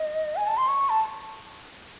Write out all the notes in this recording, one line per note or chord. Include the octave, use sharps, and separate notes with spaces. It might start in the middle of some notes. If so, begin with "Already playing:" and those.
Already playing: D#5
G#5
A5
C6
C#6
A5